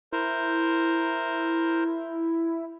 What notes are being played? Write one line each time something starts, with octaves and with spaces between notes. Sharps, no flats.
E4 A#4 C5